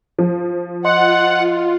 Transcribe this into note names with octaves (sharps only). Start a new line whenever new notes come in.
F3
F4 D#5 F#5 C6